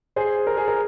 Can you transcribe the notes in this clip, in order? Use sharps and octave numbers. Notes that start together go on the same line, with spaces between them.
G#4 C5
A#4
G#4
A#4